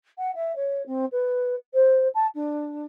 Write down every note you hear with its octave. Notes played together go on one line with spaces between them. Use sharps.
F#5
E5
C#5
C4
B4
C5
A5
D4